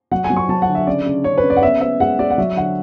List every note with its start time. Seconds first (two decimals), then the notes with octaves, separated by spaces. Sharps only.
0.11 F#3 F#5
0.24 G#5
0.30 F#3
0.36 C#6
0.49 F#3 A5
0.62 F#5
0.68 D3
0.75 E5
0.87 C#3 D5
1.06 C#3
1.24 C#3 C#5
1.38 B4
1.44 C#3
1.50 D5
1.56 F#5
1.62 B3 E5
1.81 B3 E5
2.00 G#3 F#5
2.19 G#3 D5
2.30 F#5
2.38 F#3 E5
2.57 D3 F#5